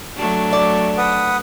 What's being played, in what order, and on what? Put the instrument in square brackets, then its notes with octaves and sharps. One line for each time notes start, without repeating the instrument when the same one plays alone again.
[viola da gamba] F#3 A3 D4
[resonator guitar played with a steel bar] D5
[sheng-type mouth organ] B4 F#5 D#6